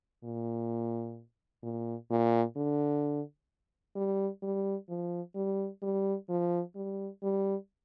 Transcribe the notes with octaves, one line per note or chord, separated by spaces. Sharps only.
A#2
A#2
A#2
D3
G3
G3
F3
G3
G3
F3
G3
G3